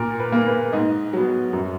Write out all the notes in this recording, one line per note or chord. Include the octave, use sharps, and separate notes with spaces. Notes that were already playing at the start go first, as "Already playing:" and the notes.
Already playing: A#2 A#4
B4
A#3
B4
G#2 D#5
F#3 B3
F#2